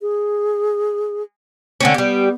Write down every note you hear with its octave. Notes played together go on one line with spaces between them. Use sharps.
G#4
D3 A3 C4 C#4
G3 B3 G4